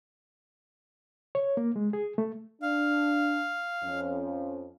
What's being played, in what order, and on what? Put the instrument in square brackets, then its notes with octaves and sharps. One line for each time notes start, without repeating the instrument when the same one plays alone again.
[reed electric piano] C#5
A#3
G#3
G#4
A3
[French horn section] D4 [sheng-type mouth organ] F5
[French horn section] F2 C#4